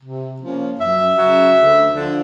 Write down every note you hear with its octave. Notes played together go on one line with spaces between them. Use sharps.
C3
F3 A#3 C#4
F#2 E5
C#3 F#3
D2
D3 F3